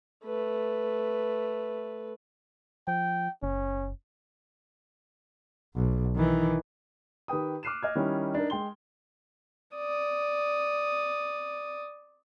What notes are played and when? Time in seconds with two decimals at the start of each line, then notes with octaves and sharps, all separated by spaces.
0.24 A3 B4
2.88 F3 G5
3.43 F#1 C#4
5.75 B1
6.15 D#3 E3
7.28 D#3 G4 B4 G5 D#6
7.63 D6 F6 F#6 C7 D#7 E7
7.83 D#5 F6 G#6
7.95 D#3 G3 C#4 D#4 E4
8.35 D4 D#4 A#4
8.50 G#3 G5 C6 G7
9.76 D5 D#6